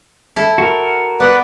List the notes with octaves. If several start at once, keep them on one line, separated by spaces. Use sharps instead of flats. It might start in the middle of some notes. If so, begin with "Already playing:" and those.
E4 A4
F#4 A#4
B3 B4 D5 F#5